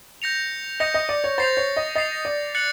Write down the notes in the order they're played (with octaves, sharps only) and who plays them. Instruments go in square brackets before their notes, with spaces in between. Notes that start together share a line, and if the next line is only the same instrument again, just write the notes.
[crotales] G6 A#6 C#7 F7
[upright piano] D#5 [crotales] G6 A#6 C#7 F7
[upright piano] D#5
D5
C#5
[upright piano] C5 [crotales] A6 C7 F7
[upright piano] C#5
D#5
[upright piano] D#5 [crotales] A6 C7 F7
[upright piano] D5
[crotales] F#6 A6 C#7 F#7